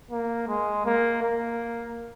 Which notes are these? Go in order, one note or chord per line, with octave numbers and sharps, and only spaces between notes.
A#3
G#3
A#3
A#3